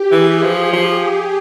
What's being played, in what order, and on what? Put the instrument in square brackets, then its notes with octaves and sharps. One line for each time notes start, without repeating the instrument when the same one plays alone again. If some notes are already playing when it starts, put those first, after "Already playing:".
Already playing: [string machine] G4
[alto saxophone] E3 [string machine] G#4
[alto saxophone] F3 [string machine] G4
[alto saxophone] F3